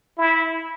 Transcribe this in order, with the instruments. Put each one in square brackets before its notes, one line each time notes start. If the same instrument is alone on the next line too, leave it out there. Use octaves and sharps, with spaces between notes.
[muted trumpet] E4